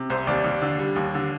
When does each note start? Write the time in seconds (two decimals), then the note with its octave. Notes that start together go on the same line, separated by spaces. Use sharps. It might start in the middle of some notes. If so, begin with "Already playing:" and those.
Already playing: C3
0.10 C2 C5
0.27 D#2 D5
0.44 D#2
0.62 D3
0.79 G3
0.96 D#2
1.14 D3